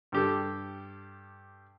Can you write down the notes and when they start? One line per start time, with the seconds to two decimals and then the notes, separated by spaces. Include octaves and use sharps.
0.12 G2 G4 A4